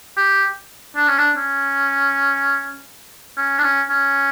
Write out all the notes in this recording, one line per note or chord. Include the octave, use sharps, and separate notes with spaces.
G4
D4
C#4
D4
C#4
C#4
D4
C#4
C#4